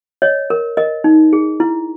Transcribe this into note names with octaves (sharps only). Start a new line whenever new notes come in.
C#5 D#5
A#4
A#4 D#5
D#4
G#4
E4